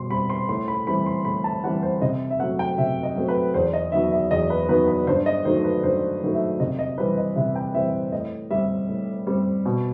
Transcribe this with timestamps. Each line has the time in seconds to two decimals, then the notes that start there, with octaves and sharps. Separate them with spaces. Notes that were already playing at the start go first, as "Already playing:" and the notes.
Already playing: B2 G3 C6
0.10 G3 C4 B5
0.30 C6
0.49 A2 C6
0.68 B5
0.87 E3 G3 C4 B5
1.06 C6
1.25 A2 B5
1.44 A5
1.63 E3 G3 C4 F#5
1.83 C5
2.01 C3 D#5
2.30 E5
2.40 F#3 A3 C4 F#5
2.59 G5
2.78 C3 E5
3.03 D#5
3.16 F#3 A3 C4
3.28 B4
3.54 E2 C5
3.73 D#5
3.92 D#3 F#3 B3 E5
4.11 E5
4.31 E2 D#5
4.50 B4
4.69 D#3 F#3 B3 B4
4.88 B4
5.07 G2 C5
5.26 D#5
5.45 D#3 F#3 A3 C5
5.64 B4
5.83 G2 C5
6.22 D#3 F#3 A3
6.34 E5
6.59 C3 D#5
6.79 D#5
6.98 E3 G3 C4 B4
7.17 D#5
7.36 C3 E5
7.55 G5
7.74 E3 G3 C4 E5
8.12 A2 D#5
8.51 G3 C4 E5
8.89 A2
9.27 G3 C4
9.65 B2